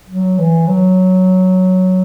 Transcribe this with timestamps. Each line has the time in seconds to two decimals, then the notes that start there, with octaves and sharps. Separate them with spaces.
0.08 F#3
0.38 E3
0.67 F#3